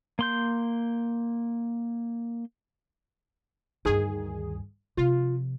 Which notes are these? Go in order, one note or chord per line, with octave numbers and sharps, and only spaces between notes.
A#3 C6 G6
D2 G2 D#3 G#4
C3 F3 F4